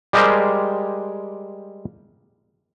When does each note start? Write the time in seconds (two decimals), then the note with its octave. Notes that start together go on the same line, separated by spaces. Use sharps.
0.13 G3 G#3 G4 G#4 A#4 C5